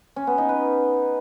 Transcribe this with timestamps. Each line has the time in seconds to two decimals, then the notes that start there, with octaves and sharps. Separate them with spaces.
0.16 C#4
0.27 B3
0.38 D#4
0.49 B4